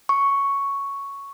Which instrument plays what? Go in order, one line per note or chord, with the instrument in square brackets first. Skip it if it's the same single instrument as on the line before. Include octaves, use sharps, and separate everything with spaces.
[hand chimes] C#6